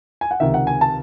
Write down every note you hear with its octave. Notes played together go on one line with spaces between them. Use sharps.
G#5
F#5
C#2 C3 D#3 E5
F#5
G#5
A5